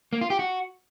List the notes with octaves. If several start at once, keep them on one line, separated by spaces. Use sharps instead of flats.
A#3
F4
G4
F#4